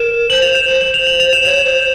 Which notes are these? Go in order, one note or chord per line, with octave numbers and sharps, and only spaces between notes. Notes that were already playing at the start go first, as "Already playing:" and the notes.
Already playing: A#4 E7
C5 F#7
F7
E7
C5 F7
F#7
F7
F#7
F7
E7
C#5 F7
C5